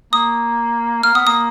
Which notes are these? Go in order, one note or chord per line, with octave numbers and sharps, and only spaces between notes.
A#3 D#6
A#3 F6
B3 D#6
A#3 D#6